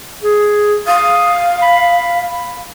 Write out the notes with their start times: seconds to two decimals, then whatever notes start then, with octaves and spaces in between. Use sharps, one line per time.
0.23 G#4
0.87 F5 D#6
1.62 B5